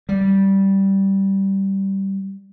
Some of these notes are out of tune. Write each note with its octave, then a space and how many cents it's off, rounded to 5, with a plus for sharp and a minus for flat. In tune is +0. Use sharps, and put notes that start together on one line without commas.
G3 -10